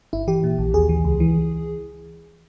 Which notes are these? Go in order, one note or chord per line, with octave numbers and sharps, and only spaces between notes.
G1 E4
E3 G4
A#2
A#1
D#2 G#4
E3
C#2
E3